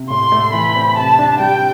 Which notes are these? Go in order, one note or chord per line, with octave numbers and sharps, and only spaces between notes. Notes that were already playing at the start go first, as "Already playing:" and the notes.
Already playing: C3
A2 C6
A3
E3 B5
C4
C3 A5
D4
G3 G5